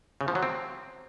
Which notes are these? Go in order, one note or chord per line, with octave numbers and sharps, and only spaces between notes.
C#3
F3
F#3
C4